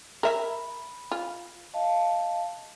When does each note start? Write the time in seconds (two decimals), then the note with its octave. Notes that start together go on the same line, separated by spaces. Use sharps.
0.23 A#4 E5 B5
1.11 F4
1.74 D#5 F5 A5